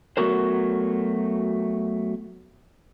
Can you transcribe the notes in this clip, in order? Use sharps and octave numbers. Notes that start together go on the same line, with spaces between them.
F#3 A3 B3 F#4 A#4 C5